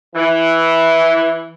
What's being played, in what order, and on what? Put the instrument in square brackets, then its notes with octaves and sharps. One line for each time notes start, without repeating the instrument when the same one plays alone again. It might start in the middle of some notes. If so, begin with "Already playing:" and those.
[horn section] E3